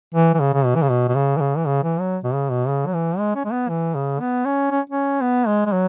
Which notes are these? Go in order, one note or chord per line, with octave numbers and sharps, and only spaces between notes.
E3
E3
C#3
C#3
B2
E3
C#3
B2
B2
C#3
E3
C#3
E3
C#3
E3
F#3
B2
C#3
B2
C#3
F#3
E3
G#3
C#4
G#3
B3
E3
C#3
B3
C#4
C#4
C#4
B3
G#3
G#3
F#3